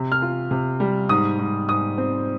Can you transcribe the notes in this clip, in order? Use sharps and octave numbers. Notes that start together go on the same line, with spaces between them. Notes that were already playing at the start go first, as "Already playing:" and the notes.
Already playing: C3
F6
F4
C3
G3
G#2 D#6
G#2
G#2 D#6
C4